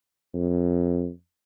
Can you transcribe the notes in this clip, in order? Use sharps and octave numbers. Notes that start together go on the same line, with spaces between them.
F2